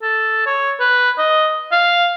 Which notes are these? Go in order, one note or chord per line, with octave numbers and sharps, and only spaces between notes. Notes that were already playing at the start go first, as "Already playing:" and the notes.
A4
C#5
B4
D#5
F5